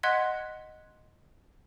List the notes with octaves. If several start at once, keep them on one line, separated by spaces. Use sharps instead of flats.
D#5 F#5 C6 F#6 G#6 B6